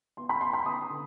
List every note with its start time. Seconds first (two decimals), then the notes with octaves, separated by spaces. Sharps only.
0.17 B3 C6
0.29 B5
0.41 B3 C6
0.53 B5
0.65 B3 D#6
0.90 D3